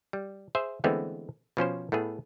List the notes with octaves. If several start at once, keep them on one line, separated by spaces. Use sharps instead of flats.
G3
G#4 C5 E5
D3 E3 G#3 A3 B3 C4
B2 F3 C#4 C5
A2 A3 B3 G#4